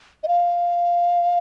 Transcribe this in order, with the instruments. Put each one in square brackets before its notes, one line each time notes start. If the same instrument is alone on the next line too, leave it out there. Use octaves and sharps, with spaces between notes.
[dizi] D#5
F5